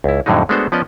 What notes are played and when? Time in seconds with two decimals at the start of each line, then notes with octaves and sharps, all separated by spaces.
0.04 C#2 E4
0.26 F2 A2 D3 F#3 G#3 D#4
0.49 G#3 A3 B3 D4 F#4 C5
0.72 F3 B3 C#4 D5 D#5